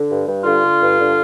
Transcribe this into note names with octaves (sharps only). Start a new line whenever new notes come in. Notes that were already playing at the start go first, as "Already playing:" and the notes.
Already playing: D3
G2
G2
D3 F4
D3
G2
D3